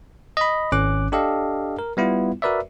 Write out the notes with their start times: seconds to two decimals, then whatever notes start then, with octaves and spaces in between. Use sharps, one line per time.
0.37 D#5 B5
0.72 G#1 C#4 D6 F#6
1.12 D4 G4 A4 D#5 F5
1.79 A#4
1.97 G3 B3 E4 F4
2.42 F#4 A#4 B4 D5 E5